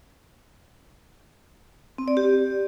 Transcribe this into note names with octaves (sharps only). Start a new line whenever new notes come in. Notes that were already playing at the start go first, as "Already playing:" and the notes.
C4
D5
G4